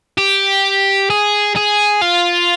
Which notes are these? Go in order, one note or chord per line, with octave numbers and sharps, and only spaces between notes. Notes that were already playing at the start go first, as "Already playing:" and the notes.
G4
G#4
G#4
F4